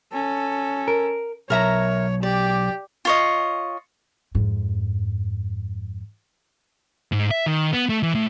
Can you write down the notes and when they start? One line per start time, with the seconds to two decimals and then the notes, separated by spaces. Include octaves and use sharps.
0.13 C#4 A4
0.88 A#4
1.50 B1 A#4 C#5 E5 A#5
2.23 G4 D5
3.05 F4 C#5 D#5
4.35 F2 G#2
7.12 G#2
7.31 E5
7.46 D#3
7.73 B3
7.89 A3
8.03 E3
8.15 A2